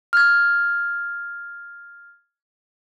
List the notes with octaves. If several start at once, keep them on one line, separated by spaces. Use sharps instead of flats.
F6 G#6